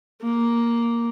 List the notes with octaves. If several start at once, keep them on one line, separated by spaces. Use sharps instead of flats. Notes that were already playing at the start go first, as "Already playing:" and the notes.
A#3